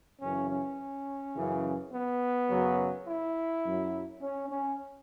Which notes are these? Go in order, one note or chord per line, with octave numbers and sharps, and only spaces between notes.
F#2 C#3 E3 C#4
C#4
F#2 C#3 E3
B3
F#2 C#3 F#3
E4
F#2 F#3
C#4
C#4